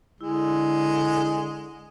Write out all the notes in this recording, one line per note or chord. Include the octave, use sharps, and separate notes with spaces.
D3 G#3 E4